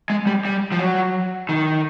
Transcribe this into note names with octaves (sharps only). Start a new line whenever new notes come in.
G#3
G3
G3
F3
F#3
D#3